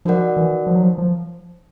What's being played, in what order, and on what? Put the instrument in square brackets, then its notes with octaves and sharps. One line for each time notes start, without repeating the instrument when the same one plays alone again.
[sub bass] F3 [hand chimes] D#4 F#4 A#4 D5 F#5
[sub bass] E3
F3
F#3
F3
F3